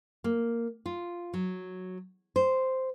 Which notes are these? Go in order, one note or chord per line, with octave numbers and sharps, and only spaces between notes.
A#3
F4
F#3
C5